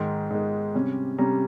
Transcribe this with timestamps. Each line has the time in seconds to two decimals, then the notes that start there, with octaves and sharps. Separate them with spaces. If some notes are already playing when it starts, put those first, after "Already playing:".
Already playing: G#2 D#3 G#3 C6
0.30 G#2 D#3 G#3
0.75 C3 G3 C#4
1.18 C3 G3 C#4 A#5